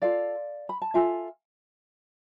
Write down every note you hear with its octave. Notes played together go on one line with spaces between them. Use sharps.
F4 A4 D5 F5
B5
A5
F4 A4 E5 G#5